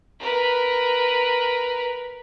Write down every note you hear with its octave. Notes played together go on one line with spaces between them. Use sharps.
A#4 B4